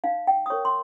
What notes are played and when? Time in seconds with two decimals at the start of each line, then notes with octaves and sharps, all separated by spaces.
0.04 D#4 F5
0.27 G5
0.46 D#6
0.50 A#4 C#5 C#6
0.65 C6